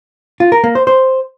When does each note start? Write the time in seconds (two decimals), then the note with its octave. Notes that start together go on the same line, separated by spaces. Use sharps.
0.40 F4
0.52 A#4
0.64 A#3
0.75 C5
0.87 C5